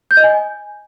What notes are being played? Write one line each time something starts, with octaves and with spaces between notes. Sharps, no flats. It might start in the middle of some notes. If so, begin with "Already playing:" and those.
G6
D#5
G#5